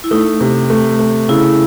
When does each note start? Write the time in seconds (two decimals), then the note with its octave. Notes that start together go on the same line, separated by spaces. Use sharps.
0.04 E4
0.11 A3 D#4
0.41 C3
0.70 A3
0.99 A3
1.29 C#3 E4